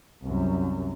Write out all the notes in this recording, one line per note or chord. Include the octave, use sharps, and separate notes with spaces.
C2 F#2